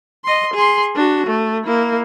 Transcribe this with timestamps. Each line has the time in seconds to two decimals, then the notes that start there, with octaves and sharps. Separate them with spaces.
0.25 D#5 C6
0.54 G#4 C6
0.95 D4 F#4
1.26 A3
1.64 A#3 E4